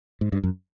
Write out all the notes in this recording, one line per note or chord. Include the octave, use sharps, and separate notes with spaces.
G#2
G2
F#2